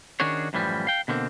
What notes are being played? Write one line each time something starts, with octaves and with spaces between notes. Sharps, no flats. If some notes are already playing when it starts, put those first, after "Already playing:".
D#3 C#4 D4 F#4 G#4 C#5
F#2 A2 E3 F3 G3
F5 G5
B2 D3 A#3 C4